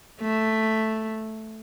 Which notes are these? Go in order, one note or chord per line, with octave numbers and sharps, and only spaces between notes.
A3